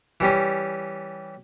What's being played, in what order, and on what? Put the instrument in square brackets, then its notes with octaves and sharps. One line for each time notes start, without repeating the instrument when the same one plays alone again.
[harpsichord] E3 G3 C#4